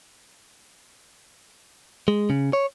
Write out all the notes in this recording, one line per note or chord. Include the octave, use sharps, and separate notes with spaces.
G#3
C#3
C#5